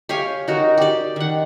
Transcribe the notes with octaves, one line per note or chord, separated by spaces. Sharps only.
G4 C#5 F5 G#5
D#4 F#4 A#4
G4 D5
D#3 F#5